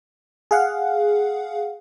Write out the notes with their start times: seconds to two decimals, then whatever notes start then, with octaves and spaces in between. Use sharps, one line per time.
0.51 G#4 F5 F#5